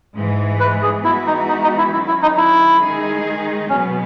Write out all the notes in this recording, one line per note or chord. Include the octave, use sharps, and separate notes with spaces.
G#2 E3 G#3
B4
G#4
E3 G#3 B3 E4 F#4
D#4
D#4
D#4
E4
D#3 F#3 C#4 E4
E4
D#4
E4
D#3 G#3 D#4 G#4
B2 F#3 B3 C#4